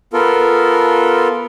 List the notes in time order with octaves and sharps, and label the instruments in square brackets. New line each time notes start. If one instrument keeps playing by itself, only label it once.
[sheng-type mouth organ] B3 F4 A4 A#4